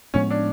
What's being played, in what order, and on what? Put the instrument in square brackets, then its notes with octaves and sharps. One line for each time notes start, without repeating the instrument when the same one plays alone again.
[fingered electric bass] A2 F3 G#3 B3 [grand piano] C#4
[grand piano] D4